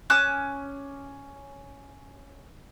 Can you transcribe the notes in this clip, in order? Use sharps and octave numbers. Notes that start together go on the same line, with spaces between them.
C#4 D6 E6 F#6